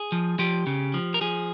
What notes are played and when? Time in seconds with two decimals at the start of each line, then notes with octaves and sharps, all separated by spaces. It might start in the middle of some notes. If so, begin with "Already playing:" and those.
Already playing: G#4
0.12 F3
0.39 F3 G4
0.67 C#3
0.94 F3
1.14 A#4
1.21 F3 G#4